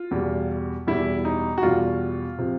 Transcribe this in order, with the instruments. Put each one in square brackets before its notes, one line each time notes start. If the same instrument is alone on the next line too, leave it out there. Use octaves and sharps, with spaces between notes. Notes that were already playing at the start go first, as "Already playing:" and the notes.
Already playing: [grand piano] F4
E2 B2 G3
E2 B2 G3 E4
D#4
F#4
E2 B2 G3 F4
C3 F3